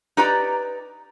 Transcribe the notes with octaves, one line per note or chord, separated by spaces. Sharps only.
D#4 G4 B4 D5 A#5